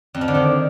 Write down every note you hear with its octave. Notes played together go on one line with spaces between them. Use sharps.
F2
F3
D3
D#3